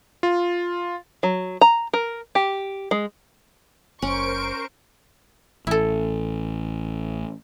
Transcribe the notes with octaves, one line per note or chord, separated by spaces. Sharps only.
F4
F#3
A#5
A#4
G4
G#3
F#1 C#4 A#4 C5 C#6 D7
A1 E4 A4